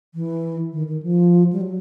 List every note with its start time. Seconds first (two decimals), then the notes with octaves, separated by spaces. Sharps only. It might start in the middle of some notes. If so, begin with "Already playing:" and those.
0.15 E3
0.73 D#3
0.88 D#3
1.03 F3
1.53 G3
1.61 F#3